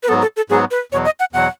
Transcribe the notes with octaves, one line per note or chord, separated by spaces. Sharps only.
B4
G#2 F#3 B3 A4
A4
A4
G#2 F#3 B3 G#4
B4
E2 B2 F#3 C#5
D#5
F#5
E2 B2 F#3 F#5